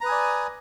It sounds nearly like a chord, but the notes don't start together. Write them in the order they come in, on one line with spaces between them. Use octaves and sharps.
A#5 B4 D#6 G#5 D5